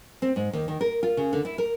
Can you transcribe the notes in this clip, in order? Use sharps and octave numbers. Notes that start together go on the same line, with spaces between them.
C4
G#2
D#2
D#3
A#4
F4
C#3
D3
E4
A#4